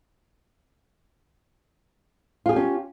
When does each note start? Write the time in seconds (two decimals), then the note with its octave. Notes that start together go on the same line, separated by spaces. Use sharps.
2.46 F4
2.49 G#4
2.53 G4
2.56 C#4